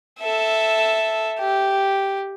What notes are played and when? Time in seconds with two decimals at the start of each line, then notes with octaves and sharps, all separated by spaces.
0.20 A4 E5
1.39 G4